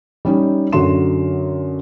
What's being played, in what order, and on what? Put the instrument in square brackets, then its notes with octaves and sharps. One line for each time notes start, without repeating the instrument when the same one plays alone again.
[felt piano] G3 C#4 D#4 G4
F#2 D3 F#4 C6 E7